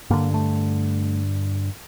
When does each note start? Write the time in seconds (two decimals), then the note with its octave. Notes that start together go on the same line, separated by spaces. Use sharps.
0.10 G2 D3 A#3
0.34 A3